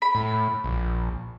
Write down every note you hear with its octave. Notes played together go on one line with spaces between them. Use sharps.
B5
A2
A#1